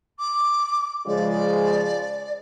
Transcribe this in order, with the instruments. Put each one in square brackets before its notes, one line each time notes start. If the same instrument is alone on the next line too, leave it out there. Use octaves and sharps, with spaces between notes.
[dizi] D6
[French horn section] C#3 F3 G#3 [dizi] D5